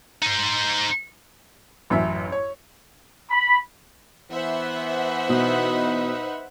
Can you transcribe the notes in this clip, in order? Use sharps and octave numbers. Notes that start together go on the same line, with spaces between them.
D#4 C5
A1 F#2 E5
C#5
B5
E3 B3 C5 E5 F#5
B2 D#4 B4